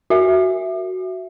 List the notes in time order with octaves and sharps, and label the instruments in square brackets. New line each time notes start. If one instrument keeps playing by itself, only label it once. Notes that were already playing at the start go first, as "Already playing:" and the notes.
[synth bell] F#4 E5